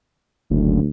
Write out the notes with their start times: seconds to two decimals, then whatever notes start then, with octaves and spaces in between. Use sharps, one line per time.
0.50 F#1 D2